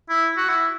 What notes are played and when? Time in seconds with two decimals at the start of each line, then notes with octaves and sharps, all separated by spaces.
0.10 E4
0.37 F#4
0.48 E4